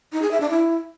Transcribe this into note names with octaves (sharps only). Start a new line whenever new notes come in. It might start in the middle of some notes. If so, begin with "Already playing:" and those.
D#4
G#4
E5
D4
E4